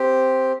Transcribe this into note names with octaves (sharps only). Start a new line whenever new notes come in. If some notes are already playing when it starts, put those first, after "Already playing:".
Already playing: C4 G4